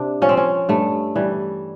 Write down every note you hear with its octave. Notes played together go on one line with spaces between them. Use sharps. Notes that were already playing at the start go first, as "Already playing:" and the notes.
Already playing: C3 D4
F3 C#4
C4
C#4
G2 A3
E3 G3